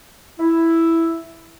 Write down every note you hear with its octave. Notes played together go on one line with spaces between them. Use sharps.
E4